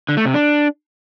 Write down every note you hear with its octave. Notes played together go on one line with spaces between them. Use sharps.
D3
A3
C3
D4